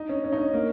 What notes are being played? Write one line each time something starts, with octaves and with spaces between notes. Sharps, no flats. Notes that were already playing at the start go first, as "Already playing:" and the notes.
Already playing: D#4
C#4
C#4
D#4
C#4
A#3